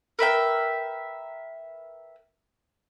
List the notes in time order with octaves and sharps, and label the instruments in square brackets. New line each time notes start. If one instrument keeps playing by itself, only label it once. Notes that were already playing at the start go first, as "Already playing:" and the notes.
[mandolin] A#4 B4 E5 G5